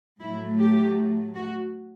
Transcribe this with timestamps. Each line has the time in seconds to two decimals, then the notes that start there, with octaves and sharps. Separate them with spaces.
0.20 A2 F#3 A3 E4
0.59 G4
1.34 F#4